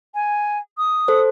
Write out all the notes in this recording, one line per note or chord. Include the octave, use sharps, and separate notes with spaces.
G#5
D#6
A4 C5